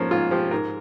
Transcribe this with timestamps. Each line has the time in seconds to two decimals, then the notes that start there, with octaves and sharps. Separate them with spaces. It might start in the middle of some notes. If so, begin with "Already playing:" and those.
Already playing: G#2 F3 A#3 C#4
0.11 G#2 F4
0.31 F3 G4
0.51 G#2 A#4